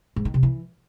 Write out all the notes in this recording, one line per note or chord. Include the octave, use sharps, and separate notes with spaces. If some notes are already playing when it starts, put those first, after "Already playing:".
G#2
D#3
C3
E3